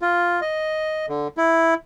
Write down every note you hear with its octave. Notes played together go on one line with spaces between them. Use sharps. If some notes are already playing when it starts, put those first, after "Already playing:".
F4
D#5
D3
E4